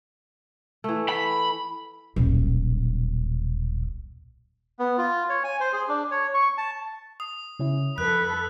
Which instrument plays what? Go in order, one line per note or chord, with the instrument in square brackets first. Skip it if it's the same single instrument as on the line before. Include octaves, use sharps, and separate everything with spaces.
[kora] E3 A3
[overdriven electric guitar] B5
[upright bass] D#1 B1
[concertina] B3
F4
C#5
G#5
C5
G#4
D4
C#5
C#6
A5
[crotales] D#6
[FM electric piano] C#3 C#4 E4
[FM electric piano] F2 [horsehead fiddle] A4 B4 [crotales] F#6